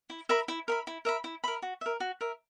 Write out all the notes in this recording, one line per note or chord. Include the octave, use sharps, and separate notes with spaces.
E4
A#4 E5 B5
E4
A#4 E5 B5
E4
A#4 E5 B5
E4
A#4 E5 B5
F#4
A#4 E5
F#4
A#4 E5